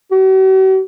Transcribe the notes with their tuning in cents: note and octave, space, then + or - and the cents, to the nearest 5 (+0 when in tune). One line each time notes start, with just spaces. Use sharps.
F#4 +45